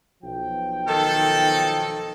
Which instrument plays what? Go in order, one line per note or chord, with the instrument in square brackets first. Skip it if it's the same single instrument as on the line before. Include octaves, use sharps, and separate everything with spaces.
[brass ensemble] B1 F3 G5
[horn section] D#3 A4